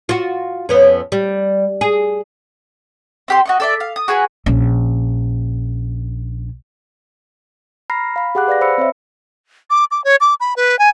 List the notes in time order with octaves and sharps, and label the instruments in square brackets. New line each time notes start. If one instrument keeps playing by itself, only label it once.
[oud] F4 F#4
F2 B3 C#4
G3
G#4
[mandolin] C4 G4 C6
F#4 D#5 C#6
A4 D5 E5
F5
D#6
F#4 G#4 B4 G#5
[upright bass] A#1 C#4
[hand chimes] A#5 B5 F6 A#6 C7
F5 B5
G4 G#4 F#5 D6 F#6
B4 D5 F5 A#6
C5 B5 E6 C#7
C4 C5 C#5 E5
[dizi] D6
D6
C#5
D6
B5
B4
G#5